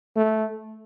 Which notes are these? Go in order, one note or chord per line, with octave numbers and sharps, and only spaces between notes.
A3